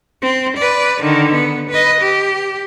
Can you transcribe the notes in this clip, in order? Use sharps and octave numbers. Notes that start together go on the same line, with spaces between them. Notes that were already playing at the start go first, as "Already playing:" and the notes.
C4
B4 D5
D3 D#3
B3
B4 D#5
G4